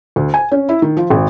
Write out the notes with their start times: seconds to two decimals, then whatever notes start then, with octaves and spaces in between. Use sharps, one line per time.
0.16 D2
0.34 G#5
0.52 C#4
0.69 E4
0.82 D#3
0.97 F3
1.10 G#1